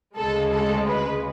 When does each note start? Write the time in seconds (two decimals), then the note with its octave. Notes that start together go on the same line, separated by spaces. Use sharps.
0.17 D2 C#3 G#3 A4
0.52 A4
0.87 B4